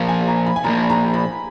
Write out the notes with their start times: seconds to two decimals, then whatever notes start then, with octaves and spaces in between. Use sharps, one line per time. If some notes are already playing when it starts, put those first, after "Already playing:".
Already playing: A#2 F3 A#3 F5
0.08 G#5
0.28 A#5
0.46 B5
0.56 G#5
0.64 A#2 F3 A#3 A#5
0.90 A#5
1.14 B5